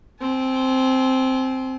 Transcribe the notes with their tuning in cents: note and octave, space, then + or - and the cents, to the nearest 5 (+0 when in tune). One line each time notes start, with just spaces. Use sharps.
C4 +0 G#5 +45